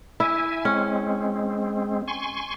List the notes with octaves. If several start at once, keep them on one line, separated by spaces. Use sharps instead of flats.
E4 E5 G#5
G#3 C4 C#4
G#5 C6 C#6